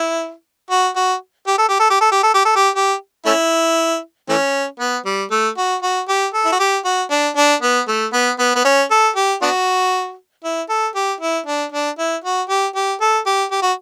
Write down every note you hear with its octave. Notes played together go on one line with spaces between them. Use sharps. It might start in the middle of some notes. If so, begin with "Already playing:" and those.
Already playing: E4
F#4
F#4
G4
A4
G4
A4
G4
A4
G4
A4
G4
A4
G4
G4
A3 C#4 E4
E3 A3 C#4
B3
G3
A3
F#4
F#4
G4
A4
E4
F#4
G4
F#4
D4
D4
B3
A3
B3
B3
B3
C#4
A4
G4
B3 D4 F#4
E4
A4
G4
E4
D4
D4
E4
F#4
G4
G4
A4
G4
G4
F#4